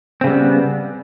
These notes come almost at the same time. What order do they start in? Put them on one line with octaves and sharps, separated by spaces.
C4 C#3 G3 B3